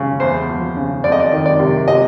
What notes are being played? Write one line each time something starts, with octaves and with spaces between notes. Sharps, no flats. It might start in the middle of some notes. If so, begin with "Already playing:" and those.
Already playing: C#3
E2 C5
F3
C#3
F2 D5
D#5
D5
D#3
D5
C3
C3 D#5